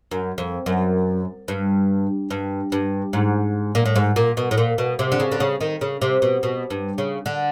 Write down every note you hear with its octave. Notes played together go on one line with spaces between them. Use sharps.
F#2
F2
F#2
G2
G2
G2
G#2
A#2
A2
G#2
A#2
B2
A2
A#2
B2
C3
D3
C#3
D3
C#3
D#3
C#3
C3
B2
B2
G2
C#3
D3